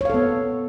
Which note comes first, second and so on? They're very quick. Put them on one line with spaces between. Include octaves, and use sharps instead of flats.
C#5 F5 A4 B3